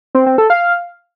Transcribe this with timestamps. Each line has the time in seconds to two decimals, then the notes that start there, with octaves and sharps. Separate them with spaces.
0.15 C4
0.26 C4
0.38 A4
0.50 F5